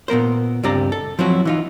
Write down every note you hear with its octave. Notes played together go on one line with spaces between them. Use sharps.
A#2 B3 A#4 C5
C#2 G2 C4 G4 D5 A#5
A4
F3 F#3 C4 E4 F#4
E3 D#4 F4